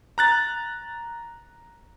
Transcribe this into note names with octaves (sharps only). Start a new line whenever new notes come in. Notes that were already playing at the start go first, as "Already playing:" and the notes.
A#5 F#6 A6